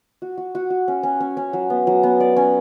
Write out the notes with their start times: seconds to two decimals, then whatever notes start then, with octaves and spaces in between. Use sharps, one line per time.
0.22 F#4
0.37 F#4
0.55 F#4
0.70 F#4
0.88 C#4
1.03 C#4
1.20 C#4
1.37 C#4
1.53 F#3
1.70 B3
1.87 F#3
2.03 B3
2.20 D5
2.36 C#4